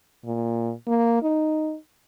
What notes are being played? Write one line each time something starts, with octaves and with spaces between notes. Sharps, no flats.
A#2
A#3
D#4